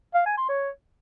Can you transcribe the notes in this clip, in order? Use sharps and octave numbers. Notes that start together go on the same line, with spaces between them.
F5
G#5
C6
C#5